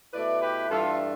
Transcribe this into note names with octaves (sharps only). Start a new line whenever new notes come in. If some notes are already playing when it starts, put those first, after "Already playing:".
B2 A3 E4 B4 D5
G4 B4
G2 E3 A3 D4 F4 A4